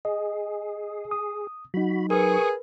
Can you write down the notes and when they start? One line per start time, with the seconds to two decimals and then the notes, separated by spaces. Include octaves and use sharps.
0.05 G#4 D#5
1.11 D#6
1.74 F#3 D#4 F#4 B5
2.10 G#4 A#4 B4 C#6 D#6